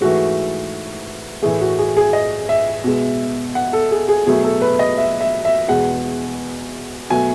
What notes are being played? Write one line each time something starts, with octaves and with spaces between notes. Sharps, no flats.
G#2 E3 A3 F#4
A2 E3 A3 G#4
F#4
G#4
G#4
D#5
E5
B2 G#3
F#5
A4
G#4
G#4
B2 F#3 A3 G#4
A4
B4
D#5
E5
E5
E5
E2 B2 G#3 F#5
B2 F#3 A3 G#5